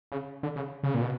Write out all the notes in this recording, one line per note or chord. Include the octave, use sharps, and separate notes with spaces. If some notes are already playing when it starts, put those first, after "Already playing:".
C#3
D3
C#3
C#3
A#2
B2